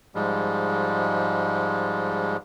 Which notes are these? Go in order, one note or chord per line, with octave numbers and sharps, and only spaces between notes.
G#2 F3 G3 G#3